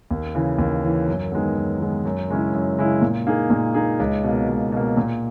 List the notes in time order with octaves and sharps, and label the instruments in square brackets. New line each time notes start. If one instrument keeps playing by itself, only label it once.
[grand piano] D#2
C#3 E3
D#2
C#3 E3
F#2
D#3 G#3 B3
F#2
D#3 G#3 B3
F#2
C#3 G#3 C#4 E4
F#2
C#3 G#3 C#4 E4
A#2
A#3 D#4 G#4
A#2
A#3 D#4 G#4
C#2
B2 A#3
C#2
B2 A#3
A#2